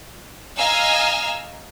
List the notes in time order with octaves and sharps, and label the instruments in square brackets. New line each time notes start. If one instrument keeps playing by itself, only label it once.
[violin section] D#5 F5 G#5 A#5 E6 F6